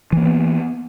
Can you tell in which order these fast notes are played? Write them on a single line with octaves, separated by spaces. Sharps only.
E3 A#3 C#4 B3